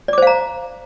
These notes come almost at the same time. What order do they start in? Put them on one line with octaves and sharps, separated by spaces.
D5 D6 C5 F5 A#5